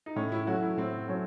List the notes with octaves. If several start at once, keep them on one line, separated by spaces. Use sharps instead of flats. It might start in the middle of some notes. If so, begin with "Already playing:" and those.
D#4
A2 C#4
E4
F#3 A3 C#4 F#4
E4
A2 C4
F#3 A3 C#4